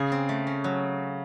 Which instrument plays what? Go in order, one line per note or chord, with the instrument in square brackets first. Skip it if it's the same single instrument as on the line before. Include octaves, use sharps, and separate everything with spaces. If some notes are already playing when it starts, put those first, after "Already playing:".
Already playing: [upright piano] C#3 [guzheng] G#4
[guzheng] C4
A3
C#4
F#3